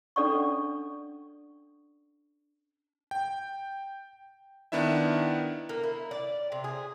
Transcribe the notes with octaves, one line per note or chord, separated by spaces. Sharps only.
C#4 D4 A4 D5 F#5 C#6
G5
D#3 B3 D4 E4 E5
A#3
E4
D5
C3
G#4